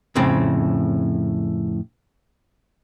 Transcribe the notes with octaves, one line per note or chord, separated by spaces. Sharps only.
F2 A2 C#3 C4